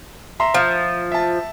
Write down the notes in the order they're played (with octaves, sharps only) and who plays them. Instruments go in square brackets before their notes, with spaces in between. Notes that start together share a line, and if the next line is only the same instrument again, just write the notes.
[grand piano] E5 A#5 C6
[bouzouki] F3
[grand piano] E5 A5